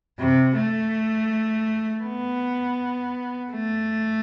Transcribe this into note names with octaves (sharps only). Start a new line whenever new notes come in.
C3
A3
B3
A3